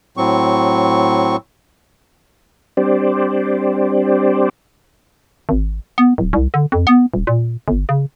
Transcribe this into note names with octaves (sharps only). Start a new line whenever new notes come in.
A2 F#3 C4 C#6
G3 C4 D4 G4 C5 D5
G#1
B3
D1
C2
D3
F2
B3
D#1
A#2
G1
C#3